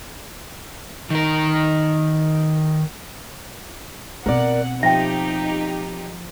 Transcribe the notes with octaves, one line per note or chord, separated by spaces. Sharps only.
D#3 A#4
B2 C4 A#4 D5 F#5
F3 D#4 G4 E5 G5